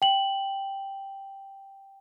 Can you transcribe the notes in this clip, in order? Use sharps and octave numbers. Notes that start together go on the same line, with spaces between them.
G5 F#7